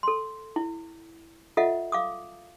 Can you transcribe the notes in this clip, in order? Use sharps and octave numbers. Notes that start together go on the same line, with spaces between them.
A4 C6
E4
F4 A4 D#5 E5 F#5
F5 D6 D#6